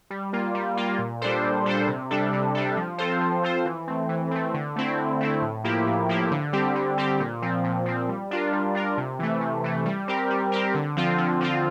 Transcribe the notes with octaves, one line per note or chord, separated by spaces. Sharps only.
G3
A#3 F4
G3
A#3 F4
A#2
G3 D4 A4 C5
A#2
G3 D4 A4 C5
C3
G3 D4 A4
C3
G3 D4 A4
F3
C4 F4 A4 C5
F3
C4 F4 A4 C5
E3
A3 C4
E3
A3 C4
D3
A3 C4 E4
D3
A3 C4 E4
A2
F3 A#3 E4 G4
A2
F3 A#3 E4 G4
D3
G3 C4 G4
D3
G3 C4 G4
A#2
F3 C4
A#2
F3 C4
G3
D4 F4 A#4
G3
D4 F4 A#4
C3
E3 A3
C3
E3 A3
G3
C4 G4 A#4
G3
C4 G4 A#4
D3
F3 C4 F4
D3
F3 C4 F4